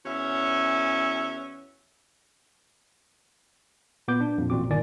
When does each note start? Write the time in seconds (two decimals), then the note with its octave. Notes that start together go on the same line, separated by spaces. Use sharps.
0.05 E2 C#4 F#4 E5
4.08 A#2 B3 D6 G6
4.21 D4
4.38 F2 A#2
4.50 A1 A#2 C4 F#4 D6
4.69 G1 A#2 D#3 D5 G#5